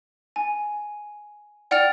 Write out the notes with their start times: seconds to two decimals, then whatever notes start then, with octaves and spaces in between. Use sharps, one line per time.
0.36 G#5
1.71 D5 F#5 G5 F6 A6 F7